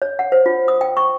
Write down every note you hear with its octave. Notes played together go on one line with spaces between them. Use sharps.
C#5
F#5
C5
F4
D#6
G5
C#6